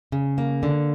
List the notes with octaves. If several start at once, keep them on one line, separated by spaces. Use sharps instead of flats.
C#3
A#3
D3